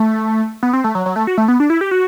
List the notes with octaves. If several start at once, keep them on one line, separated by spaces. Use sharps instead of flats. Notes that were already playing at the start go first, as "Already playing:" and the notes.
Already playing: A3
B3
C4
A3
F#3
F#3
A3
F#4
A3
B3
D4
E4
G4
F#4